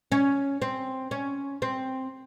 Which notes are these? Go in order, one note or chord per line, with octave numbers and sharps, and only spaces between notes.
C#4
C4
C#4
C4